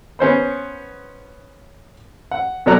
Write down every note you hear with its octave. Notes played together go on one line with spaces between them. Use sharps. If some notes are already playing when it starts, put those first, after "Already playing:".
B3 C#4 C5 B5
F#5
B2 F#3 A4 D5 A#5 F#6